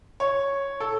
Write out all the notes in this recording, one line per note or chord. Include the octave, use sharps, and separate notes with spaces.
C#5
A4